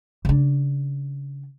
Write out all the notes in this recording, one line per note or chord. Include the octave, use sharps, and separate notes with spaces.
C#3 D4